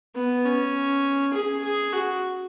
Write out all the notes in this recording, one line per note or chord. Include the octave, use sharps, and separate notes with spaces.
B3
C#4
G#4
G#4
F#4